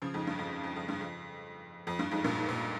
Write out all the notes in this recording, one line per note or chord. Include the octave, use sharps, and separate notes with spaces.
C#3 F3
F2 G#2
G2
F2
F2
F2
G2
F2
F2
G2
F2 G#2
G2 A#2
G#2
A#2